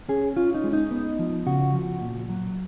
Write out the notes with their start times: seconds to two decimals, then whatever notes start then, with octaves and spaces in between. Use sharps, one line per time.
0.09 C#4 G#4
0.36 C#4 F4
0.54 D#4
0.64 G#3
0.73 D#4
0.91 B3
1.19 F3
1.47 C#3 F#4
1.74 F3
2.01 A#2
2.29 F#3